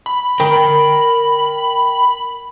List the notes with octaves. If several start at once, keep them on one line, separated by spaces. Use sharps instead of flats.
B5
A#4 G5